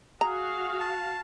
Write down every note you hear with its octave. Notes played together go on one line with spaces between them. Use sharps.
F#4 G#4 F5 A#5
A5